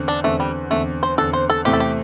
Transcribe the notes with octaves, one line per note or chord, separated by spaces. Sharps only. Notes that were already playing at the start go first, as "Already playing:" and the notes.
Already playing: E2 D3 C4
D4
E2 D3 A3 C4
G3
E2 D3 A3 C4
C5
E2 D3 C4 A4
C5
A4
E2 C3 A3 C4 E4 G4
A4
G4